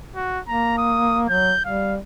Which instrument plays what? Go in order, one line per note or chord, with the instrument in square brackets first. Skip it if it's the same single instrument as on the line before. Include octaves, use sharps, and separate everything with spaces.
[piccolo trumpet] F#4
[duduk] A#3 [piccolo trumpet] A#5
[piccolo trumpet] D#6
[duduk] F#3 [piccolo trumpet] G6
[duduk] G3 [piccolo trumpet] F5